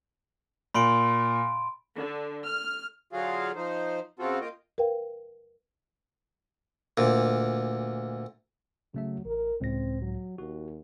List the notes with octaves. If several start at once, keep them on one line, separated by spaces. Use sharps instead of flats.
A#2 B5 C6 D7
D3
F6
D3 F#3 F4 F#4 G#4 F5
F3 D#4 C5
C#3 C4 F4 F#4 A4
A#3 F4 D#5 G5
A#4 B4 F5 G5
D2 A#2
C#3 F#3 A3 E5
A1 A#4
C#2 A2 C4 A#6
F#3
D#2 F#4